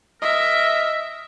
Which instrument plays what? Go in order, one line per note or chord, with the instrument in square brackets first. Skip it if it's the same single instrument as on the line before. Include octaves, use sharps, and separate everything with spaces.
[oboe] A#4 [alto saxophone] D#5 [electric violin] E5